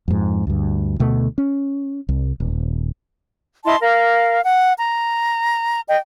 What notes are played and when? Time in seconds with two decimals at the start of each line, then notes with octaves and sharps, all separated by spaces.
0.08 F2 G#2
0.47 D2 G2
1.00 D2 B2 A3
1.38 C#4
2.09 C2
2.40 D#1
3.65 E4 D#5 A5 C6
3.80 A#4 F5
4.42 F#5
4.78 A#5
5.88 D#5 G5